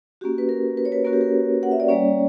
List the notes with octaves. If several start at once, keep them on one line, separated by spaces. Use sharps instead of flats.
A#3 C#4 F#4 G4
B4
A#4
B4
C#5
B4
A#3 C#4 F#4 A#4
G4
A#4
F#5
E5
D5
G3 A#3 C#4 C#5